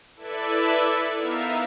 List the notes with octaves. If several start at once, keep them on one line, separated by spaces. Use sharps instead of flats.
E4 A4 B4 D5 E5
B3 D#4 A#4 E5 F5